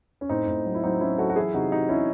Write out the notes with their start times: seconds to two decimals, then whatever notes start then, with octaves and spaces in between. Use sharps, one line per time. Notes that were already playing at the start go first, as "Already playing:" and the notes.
0.21 C#4
0.29 A2 C4 D#4
0.47 A2
0.66 F#3
0.75 E4
0.84 F#3 C4 D#4
1.00 F#3 C#4 E4
1.18 F#3 F#4 A4
1.29 F#4
1.36 E3 E4 G#4
1.54 C3 D#4 F#4
1.72 E3 D#4 F#4
1.89 C3 C#4 E4